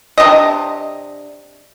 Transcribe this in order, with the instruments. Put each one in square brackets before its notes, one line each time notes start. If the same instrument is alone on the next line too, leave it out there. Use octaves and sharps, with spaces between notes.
[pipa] C3 B3 D4 D#5